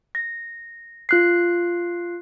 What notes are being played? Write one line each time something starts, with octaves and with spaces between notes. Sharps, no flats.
A#6
F4 F#6 C7